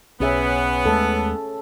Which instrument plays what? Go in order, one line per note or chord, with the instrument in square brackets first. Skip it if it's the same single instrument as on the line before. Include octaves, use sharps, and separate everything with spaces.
[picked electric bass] B1 [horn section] B3 [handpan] C#4 G#4 E5
[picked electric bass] D#2 G#3 A3 [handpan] A4